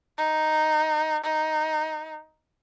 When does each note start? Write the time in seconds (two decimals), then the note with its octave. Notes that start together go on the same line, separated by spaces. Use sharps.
0.17 D#4
1.24 D#4